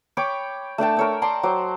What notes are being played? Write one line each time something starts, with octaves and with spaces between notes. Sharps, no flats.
C#5 G5 B5 D6
A3 D4 G5 A5
A#4 C#5 E6
D5 A5 A#5 C6
F#3 C5 D6